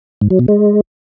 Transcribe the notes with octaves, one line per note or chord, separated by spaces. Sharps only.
G#2
F#3
B2
G#3